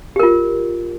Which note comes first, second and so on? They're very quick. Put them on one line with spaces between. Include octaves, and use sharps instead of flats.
G4 A#4 F4